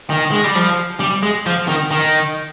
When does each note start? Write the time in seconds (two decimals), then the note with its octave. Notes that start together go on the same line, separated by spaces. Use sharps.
0.10 D#3
0.31 G#3
0.44 G3
0.55 F3
1.00 G3
1.23 G#3
1.46 F3
1.68 D#3
1.91 D#3